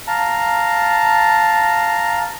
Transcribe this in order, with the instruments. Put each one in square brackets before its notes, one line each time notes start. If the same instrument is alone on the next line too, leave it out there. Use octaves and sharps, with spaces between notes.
[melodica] F5 A5 A#5